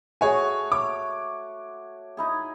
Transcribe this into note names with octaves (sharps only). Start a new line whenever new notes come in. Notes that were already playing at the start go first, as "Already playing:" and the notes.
A3 F#4 G#4 C#5 G#5
C#5 D6
D#4 E4 G#4